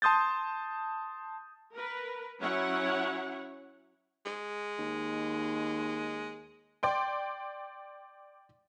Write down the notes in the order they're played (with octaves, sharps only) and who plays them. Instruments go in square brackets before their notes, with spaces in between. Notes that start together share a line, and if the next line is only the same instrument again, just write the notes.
[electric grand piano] A5 C6 D#6 G6 A6
[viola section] A#4 B4
F#3 C#4 E4 C#5 F#5
[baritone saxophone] G#3
[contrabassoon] D#2
[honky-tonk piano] D5 G5 C6